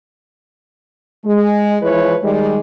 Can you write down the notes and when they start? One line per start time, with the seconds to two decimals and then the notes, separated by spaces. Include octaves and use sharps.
1.25 G#3
1.82 E3 F3 G#3 E4 B4 C#5
2.22 D#3 G3 G#3